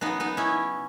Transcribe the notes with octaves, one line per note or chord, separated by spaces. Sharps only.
C#3 F#3 B3 D#4
B3 D#4
C#4 E4